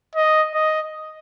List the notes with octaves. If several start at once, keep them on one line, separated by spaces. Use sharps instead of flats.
D#5
D#5